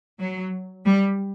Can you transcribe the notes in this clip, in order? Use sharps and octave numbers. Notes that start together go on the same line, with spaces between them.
F#3
G3